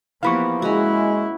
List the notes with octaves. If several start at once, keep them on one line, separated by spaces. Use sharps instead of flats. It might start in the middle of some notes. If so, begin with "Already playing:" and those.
E3 F3 A#3 B3 G4 F5 B5 C#6
G#3 C#4 E4 F#4